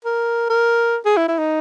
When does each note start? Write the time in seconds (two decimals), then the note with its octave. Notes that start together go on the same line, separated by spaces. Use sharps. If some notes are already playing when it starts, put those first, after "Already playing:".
0.05 A#4
0.50 A#4
1.05 G#4
1.17 E4
1.28 E4
1.38 D#4